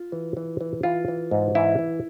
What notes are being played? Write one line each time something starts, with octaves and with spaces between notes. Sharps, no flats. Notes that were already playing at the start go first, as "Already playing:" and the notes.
Already playing: F4
E3
E3
E3
E3 F4
E3
G#2
E3 E4
E3